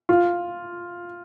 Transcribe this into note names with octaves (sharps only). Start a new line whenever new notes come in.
F4